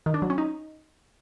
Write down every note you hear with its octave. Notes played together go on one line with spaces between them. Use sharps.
D#3
D4
F#3
C#4
D#4